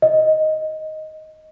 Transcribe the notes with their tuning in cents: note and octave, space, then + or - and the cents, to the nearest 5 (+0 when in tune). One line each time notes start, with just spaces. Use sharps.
D#5 +5